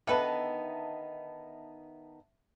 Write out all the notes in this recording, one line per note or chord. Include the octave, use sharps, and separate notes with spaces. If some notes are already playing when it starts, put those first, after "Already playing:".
D3 D#3 B3 D#4 A4 B4 E5 A5